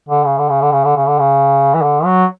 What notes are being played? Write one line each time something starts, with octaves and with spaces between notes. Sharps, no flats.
D3
C#3
D3
C#3
D3
C#3
D3
C#3
D3
C#3
E3
D3
F#3